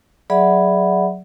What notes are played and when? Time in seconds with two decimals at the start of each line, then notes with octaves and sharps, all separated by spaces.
0.30 F#3 G#4 D5 E5 F#5 B5